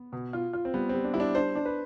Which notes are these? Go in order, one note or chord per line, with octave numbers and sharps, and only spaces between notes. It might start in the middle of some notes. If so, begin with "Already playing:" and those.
Already playing: B3
B2
F4
F4
C4
G3 B3
C4
G3
D4
G3 E4
D4
D4 C5
D4
B4